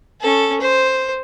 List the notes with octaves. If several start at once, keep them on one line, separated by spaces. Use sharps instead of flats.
C#4 A4
C5